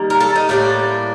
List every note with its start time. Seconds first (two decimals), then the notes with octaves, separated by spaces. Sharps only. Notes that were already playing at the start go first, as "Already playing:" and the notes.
Already playing: D#3 G3 A#3
0.10 A#4
0.20 A4
0.35 D#4
0.49 A2 G3 A#3 D4